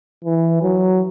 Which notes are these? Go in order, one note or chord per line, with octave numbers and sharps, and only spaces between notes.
E3
F#3